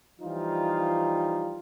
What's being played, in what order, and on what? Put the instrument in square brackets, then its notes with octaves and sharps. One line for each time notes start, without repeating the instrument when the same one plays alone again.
[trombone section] E3 F3 G3 D#4 F4